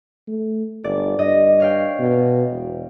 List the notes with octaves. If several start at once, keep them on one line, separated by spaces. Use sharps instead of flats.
A3
G1 D5
G2 D#5
C#5 F5 G5
B2
E1